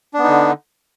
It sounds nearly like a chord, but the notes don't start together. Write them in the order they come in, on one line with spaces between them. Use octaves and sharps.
D4 B3 D#4 D3